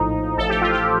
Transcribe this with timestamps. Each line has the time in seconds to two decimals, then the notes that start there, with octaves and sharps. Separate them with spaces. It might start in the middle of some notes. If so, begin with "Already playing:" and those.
Already playing: A#1 A2 F3 D#4
0.38 A1 A2 F3 A4
0.49 G4
0.61 F4
0.72 G4